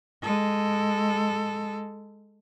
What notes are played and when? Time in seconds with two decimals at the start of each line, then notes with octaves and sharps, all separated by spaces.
0.23 G#3 A4